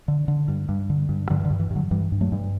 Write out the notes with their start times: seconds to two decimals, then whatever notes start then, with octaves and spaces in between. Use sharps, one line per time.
0.08 D3
0.28 D3
0.48 G2
0.69 G2
0.90 D3
1.09 G2
1.30 G2 D3 F#3
1.40 E3
1.45 D3
1.50 G2
1.60 E3
1.70 G2
1.76 D3 F#3
1.91 G2 E3 G3
2.12 G2
2.21 F#3 A3
2.32 G2